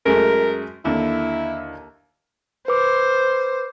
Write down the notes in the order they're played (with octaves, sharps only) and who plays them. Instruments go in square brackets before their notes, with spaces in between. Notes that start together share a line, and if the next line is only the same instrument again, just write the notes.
[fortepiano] F#2 G#3 A3 [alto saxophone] A#4
[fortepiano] D#2 D3 [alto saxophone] E4
[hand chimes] B4 D6 [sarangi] C5